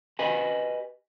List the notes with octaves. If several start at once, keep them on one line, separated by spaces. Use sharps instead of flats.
G4 B4 D#5 G#5